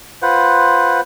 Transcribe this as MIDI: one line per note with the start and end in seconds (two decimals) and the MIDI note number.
0.22 1.01 65
0.22 1.01 71
0.22 1.01 72
0.22 1.01 78